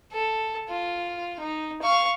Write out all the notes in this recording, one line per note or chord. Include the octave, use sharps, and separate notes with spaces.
A4
F4
D#4
F5 C#6